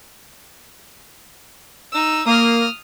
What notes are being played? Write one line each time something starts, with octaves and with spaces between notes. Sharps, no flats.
D#4 E6
A#3 D#6 F6